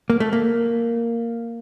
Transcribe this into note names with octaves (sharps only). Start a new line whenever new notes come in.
A#3
A3
A#3